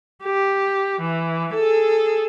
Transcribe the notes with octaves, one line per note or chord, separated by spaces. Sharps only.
G4
E3
G#4 A4